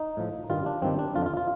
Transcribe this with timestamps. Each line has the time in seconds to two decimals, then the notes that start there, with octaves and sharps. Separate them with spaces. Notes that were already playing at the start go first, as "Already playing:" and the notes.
Already playing: D#4
0.17 A2 F3
0.49 G2 D#3 G3 F4
0.66 D4
0.82 G2 D#3 G3 C4
0.99 D4
1.15 F2 D3 F3 F4
1.26 F4
1.37 F4